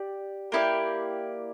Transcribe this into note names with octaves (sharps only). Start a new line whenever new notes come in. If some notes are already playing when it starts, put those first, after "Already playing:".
Already playing: G4 D5
A#3 E4 G4 D5